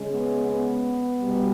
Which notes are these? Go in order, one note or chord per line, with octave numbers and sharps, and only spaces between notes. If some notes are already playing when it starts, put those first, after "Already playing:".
Already playing: C#3 G#3
B3
B3
B2 G3